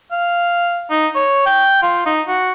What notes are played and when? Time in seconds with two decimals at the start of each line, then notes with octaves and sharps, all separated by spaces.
0.12 F5
0.90 D#4
1.15 C#5
1.46 G5
1.82 F4
2.06 D#4
2.28 F#4